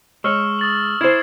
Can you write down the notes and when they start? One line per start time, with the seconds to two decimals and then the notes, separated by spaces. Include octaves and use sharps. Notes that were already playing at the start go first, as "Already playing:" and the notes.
0.24 G#3 C#5 C#6 E6 F6
0.59 D#6 A6 F#7
1.01 E4 C5 G#6 C7